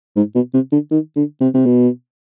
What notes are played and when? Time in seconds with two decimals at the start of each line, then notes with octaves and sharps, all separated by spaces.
0.17 G#2
0.35 B2
0.54 C3
0.72 D3
0.91 D#3
1.16 D3
1.41 C3
1.55 C3
1.66 B2